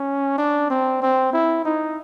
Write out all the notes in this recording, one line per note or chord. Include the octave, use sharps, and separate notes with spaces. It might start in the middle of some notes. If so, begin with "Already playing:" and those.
Already playing: C#4
D4
C4
C4
E4
D#4